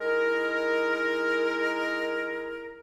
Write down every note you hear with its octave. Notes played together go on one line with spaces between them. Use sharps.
G#3 D#4 E4 A#4